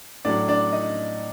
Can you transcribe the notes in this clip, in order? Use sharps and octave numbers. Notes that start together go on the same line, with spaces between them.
A2 F#3 D4 D5
D4 D5
D#4 D#5